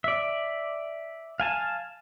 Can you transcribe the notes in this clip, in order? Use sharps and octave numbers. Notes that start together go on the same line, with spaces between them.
D5 E5
F5 G#5 A5